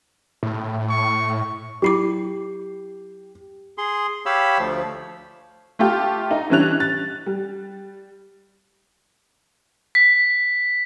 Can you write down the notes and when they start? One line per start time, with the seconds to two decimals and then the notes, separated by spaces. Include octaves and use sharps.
0.43 A2
0.89 C#6
1.82 F#3 E4 G4 D6
3.78 G#4 C6
4.26 G4 C#5 F5 B5 E6
4.58 D2 F3
5.79 A3 F4 G4
6.31 D#4
6.50 E3 G3 C#4 D4 F#6 F7
6.80 A6
7.26 G3
9.95 B6